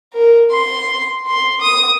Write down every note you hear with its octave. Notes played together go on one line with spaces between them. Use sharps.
A#4
C6
C6
D#6